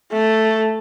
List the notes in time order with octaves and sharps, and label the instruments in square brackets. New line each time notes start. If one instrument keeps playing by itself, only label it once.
[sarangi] A3